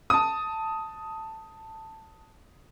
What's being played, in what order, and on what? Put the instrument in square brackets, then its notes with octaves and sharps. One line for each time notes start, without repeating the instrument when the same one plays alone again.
[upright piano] A5 D#6